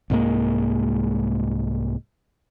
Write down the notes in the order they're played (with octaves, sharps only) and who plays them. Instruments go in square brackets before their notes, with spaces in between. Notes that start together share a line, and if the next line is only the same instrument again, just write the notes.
[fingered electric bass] C2 G#2 G#3 A#3